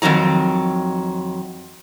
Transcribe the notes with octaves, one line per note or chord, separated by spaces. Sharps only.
F2 G#2 D#3 F#3 A#5